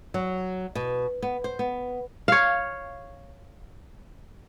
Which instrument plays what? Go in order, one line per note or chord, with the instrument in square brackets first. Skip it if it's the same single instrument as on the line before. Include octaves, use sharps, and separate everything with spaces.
[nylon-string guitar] F#3
B2
B3
C5
B3
[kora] C#5 F5